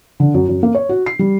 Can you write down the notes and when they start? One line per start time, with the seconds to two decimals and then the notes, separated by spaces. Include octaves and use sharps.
0.20 D3
0.34 F#2
0.49 F#2
0.63 A#3
0.75 C#5
0.89 F#4
1.06 C7
1.19 G3